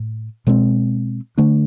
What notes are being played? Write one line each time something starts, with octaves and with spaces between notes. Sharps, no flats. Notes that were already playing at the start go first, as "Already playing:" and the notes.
Already playing: A2
B2 G#3 C4
D3 A3 D4